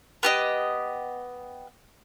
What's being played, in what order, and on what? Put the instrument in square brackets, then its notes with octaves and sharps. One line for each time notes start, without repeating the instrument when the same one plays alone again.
[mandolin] B3 G4 D#5